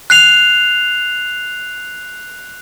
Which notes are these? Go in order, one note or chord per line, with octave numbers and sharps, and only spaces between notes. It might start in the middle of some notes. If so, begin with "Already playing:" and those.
F#6 C7 F7